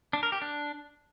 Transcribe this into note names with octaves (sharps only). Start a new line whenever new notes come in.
D4
A#4
G4
D4